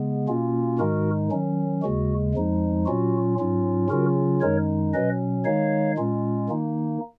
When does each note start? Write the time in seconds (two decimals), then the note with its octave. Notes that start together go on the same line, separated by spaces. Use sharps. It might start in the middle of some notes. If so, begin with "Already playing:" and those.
Already playing: C#3 G#3 B3
0.28 B2 A#3 C#4 F4
0.79 G#2 D#3 G#3 D#4 F#4 A#4
1.31 D#3 F#3 C#4
1.82 D#2 C#3 G#3 F#4
2.34 F2 F3 G#3 D#4
2.86 A#2 F#3 C#4 F4 F#4
3.38 G#2 F#3 C#4 F4
3.89 C#3 F#3 C#4 F4 F#4 A#4
4.41 F#2 D#3 G#3 D#4 A#4 C#5
4.94 B2 F#3 C#4 B4 D#5
5.45 D#3 G#3 D#4 C#5 F5
5.98 A#2 G#3 C#4 F4
6.49 D#3 A#3 D#4